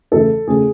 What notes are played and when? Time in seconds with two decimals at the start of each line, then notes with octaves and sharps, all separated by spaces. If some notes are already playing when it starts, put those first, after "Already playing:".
0.12 E2 C#3 E3 A3 A4
0.47 E2 C#3 E3 A3 G#4